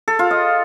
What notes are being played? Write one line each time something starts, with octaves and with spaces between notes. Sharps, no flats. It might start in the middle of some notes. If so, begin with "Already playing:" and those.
A4
F4
D#5